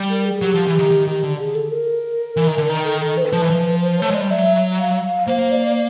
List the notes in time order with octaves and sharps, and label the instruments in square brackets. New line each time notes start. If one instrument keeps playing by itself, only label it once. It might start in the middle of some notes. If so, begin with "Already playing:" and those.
Already playing: [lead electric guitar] G3
[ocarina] A#4
G#4
[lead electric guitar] F#3 [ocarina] G4
[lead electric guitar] F3
E3
D#3
D#3
D#3
D3
[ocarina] G#4
A4
A#4
[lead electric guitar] E3
D#3
D3
D#3
[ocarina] A4
A4
C5
B4
[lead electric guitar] F3
E3
F3
[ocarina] C5
[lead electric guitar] A3 [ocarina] C#5
[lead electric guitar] G#3 [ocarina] D5
[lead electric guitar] G3
[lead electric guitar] F#3 [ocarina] E5
[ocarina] F5
F5
[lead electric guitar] A#3 [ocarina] C5
[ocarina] D5